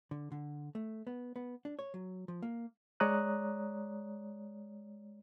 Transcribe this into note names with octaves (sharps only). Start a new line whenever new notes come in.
D3
D3
A3
B3
B3
D4
C#5
F#3
F3
A#3
G#3 C#5 D5 A#5 D#6 F#6